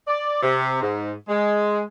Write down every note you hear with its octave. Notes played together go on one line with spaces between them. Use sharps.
D5
C3
G#2
G#3